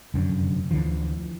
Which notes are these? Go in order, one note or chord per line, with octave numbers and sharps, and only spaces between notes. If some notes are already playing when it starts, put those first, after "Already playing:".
F1 F#2 D3
D2 D3 E3 F3